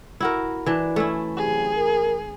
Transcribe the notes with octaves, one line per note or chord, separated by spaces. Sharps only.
E4 F#4 A#4
E3 D4
A3 C#4 E4
C3 F#3 G4 G#4
A#4